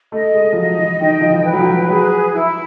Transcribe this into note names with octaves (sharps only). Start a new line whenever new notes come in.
A3 D#5
G#3
F3
F#3 D#5
E3
D#3 G5
F3
E3
B4
F#3
F3
F#3 G#4
E4